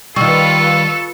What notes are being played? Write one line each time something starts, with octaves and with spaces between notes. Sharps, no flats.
D#3 G3 F4 A4 B4 C#6 E6